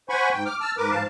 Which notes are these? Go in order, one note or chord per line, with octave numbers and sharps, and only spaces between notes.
C5 F#5 G#5 B5 C#6
G#2 G5
D6 F6
A5 E6 F6
G#2 A#4 B4 D6
G#2 F3 F5 A5